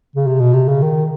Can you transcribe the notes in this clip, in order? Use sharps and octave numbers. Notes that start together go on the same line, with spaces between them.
C#3
C3
B2
C3
C#3
D#3